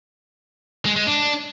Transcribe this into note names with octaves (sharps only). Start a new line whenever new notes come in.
G#3
G#3
D4